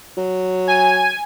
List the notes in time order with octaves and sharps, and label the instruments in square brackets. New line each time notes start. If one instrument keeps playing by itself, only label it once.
[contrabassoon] F#3
[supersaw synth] G#5